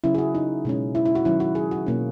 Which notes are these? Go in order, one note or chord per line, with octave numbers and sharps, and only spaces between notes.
C#3 F#3 C#4 E4
G#4
F#4
D#4
B2 G#3 C#4
E4
E4
F#4
D#3 F#3 C#4 E4
F#4
G#4
F#4
B2 A#3 C#4